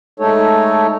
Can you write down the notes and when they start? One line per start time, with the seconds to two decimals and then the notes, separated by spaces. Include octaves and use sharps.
0.20 G#3 A3 D#4 A4 C#5